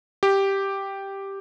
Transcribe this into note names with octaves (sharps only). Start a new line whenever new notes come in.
G4